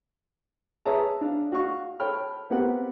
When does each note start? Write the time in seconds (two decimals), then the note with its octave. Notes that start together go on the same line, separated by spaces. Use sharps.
0.85 G#4 B4 C#5 E5 A5 A#5
1.21 D4 F5
1.52 F#4 F5 C#6
2.00 A4 C#5 G5 B5 F6
2.50 B3 C4 G4 A#4 F#5